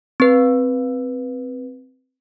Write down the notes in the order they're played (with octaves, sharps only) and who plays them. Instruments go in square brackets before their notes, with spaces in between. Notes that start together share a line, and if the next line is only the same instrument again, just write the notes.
[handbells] C4 B4